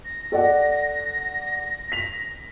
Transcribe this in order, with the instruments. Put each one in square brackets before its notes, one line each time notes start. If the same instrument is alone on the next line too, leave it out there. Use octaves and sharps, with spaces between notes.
[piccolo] A#6
[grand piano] A4 D5 F#5
B6 F7